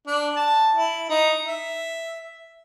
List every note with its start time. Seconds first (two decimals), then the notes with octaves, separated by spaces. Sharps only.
0.07 D4
0.36 A5
0.75 E4
1.09 D#4
1.47 E5